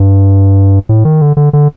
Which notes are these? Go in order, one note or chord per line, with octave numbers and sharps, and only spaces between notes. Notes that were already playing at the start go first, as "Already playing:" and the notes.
Already playing: G2
A2
D#3
D3
D3
D3